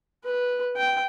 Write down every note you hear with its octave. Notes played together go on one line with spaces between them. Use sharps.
B4
G5